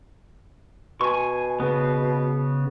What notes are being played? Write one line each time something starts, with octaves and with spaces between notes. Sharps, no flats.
B2 G#5 C#6
C#3 B3